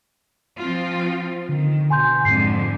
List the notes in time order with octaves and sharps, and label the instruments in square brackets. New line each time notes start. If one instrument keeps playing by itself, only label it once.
[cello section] F3 C4 F4
[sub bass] D3 [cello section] D#3
[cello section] B2 [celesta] G#5 C6 G6
[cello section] F2 D3 G#3 [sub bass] G#2 [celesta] C7